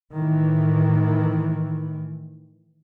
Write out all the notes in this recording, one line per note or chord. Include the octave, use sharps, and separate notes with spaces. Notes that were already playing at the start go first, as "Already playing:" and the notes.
A2 D#3 E3